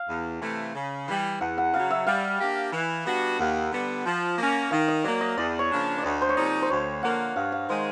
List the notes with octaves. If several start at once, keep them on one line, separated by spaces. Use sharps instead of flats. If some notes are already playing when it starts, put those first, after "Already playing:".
Already playing: F5
E2
C3 E3 A3
C#3
E3 G3
E2 F#5
F#5
C#3 F#3 F5
E5
G3 F5
A#3 D4 G4
E3
G3 B3 D4 F#4
D#2 F#5
D3 G3 B3
F3
A#3 C#4
D#3 F5
D#5
F#3 A#3 D5
D#5
E2 D5
C#5
C#3 F3 A#3 D4
D5
D2 D#5
C5
C#5
C3 F3 A#3 D#4 D5
C5
D2 C#5
D3 F3 A#3 F#5
G2 F5
F5
D#3 G#3 C5